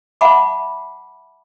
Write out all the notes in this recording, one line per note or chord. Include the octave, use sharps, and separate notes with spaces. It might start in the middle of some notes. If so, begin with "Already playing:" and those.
E5 F#5 A5 B5 D6